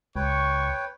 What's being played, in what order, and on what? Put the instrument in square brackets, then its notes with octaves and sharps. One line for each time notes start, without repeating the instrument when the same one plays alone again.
[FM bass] C#2 [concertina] B4 C#5 G5 [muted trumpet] C#6